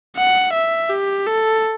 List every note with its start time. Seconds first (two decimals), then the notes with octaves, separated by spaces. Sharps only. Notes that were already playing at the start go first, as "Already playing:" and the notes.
0.17 F#5
0.53 E5
0.90 G4
1.27 A4